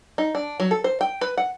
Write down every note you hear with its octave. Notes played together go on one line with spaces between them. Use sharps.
D#4
D4
F#3
A4
C5
G5
B4
F#5